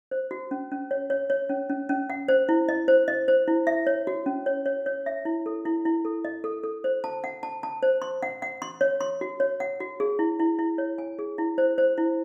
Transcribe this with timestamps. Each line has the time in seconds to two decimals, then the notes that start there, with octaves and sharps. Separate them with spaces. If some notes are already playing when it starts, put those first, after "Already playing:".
0.11 C5
0.31 F#4
0.51 C#4
0.72 C#4
0.91 C#5
1.10 C#5
1.30 C#5
1.49 C#4
1.69 C#4
1.89 C#4
2.10 F#5
2.28 C5
2.49 E4
2.69 D#5
2.88 C5
3.08 D#5
3.28 C5
3.48 E4
3.67 E5
3.87 C#5
4.07 F#4
4.26 C#4
4.46 C#5
4.66 C#5
4.86 C#5
5.06 E5
5.25 E4
5.46 A4
5.65 E4
5.85 E4
6.05 A4
6.25 D#5
6.44 A4
6.63 A4
6.84 C5
7.04 A5
7.24 F#5
7.43 A5
7.63 A5
7.83 C5
8.02 C6
8.23 F#5
8.42 F#5
8.62 C6
8.81 C#5
9.01 C6
9.21 F#4
9.40 C#5
9.60 F#5
9.80 F#4
10.00 G#4
10.19 E4
10.39 E4
10.59 E4
10.78 C#5
10.98 G#5
11.19 G#4
11.38 E4
11.58 C5
11.78 C5
11.98 E4